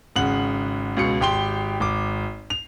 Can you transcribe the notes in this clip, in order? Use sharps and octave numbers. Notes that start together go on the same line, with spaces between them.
G#1 C#3 F#5 F#7
C#2 B2 C#7
G#1 G4 G5 C6 G7
G#1 D6
F7